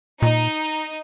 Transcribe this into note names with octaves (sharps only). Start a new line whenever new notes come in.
A#2 D#4